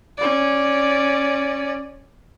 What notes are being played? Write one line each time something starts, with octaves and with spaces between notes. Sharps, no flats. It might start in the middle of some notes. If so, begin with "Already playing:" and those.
C#4 D5